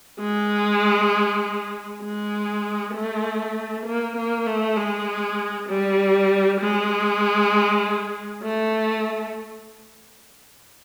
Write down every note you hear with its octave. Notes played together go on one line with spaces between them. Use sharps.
G#3
G#3
A3
A#3
A#3
A3
G#3
G3
G#3
A3